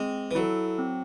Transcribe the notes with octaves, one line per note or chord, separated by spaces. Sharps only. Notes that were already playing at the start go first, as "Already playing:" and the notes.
Already playing: G#3 C4
E3
F#3 E4 A4
C4